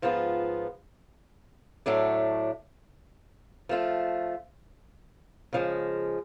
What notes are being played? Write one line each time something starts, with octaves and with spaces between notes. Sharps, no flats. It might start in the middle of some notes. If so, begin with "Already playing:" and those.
G#2 F3 B3 F4
A2 F#3 A3 D4
F3 A3 F4
C#3 F3 G#3